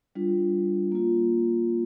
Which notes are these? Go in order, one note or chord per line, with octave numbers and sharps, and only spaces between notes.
G3 D4 F4
A#3 F4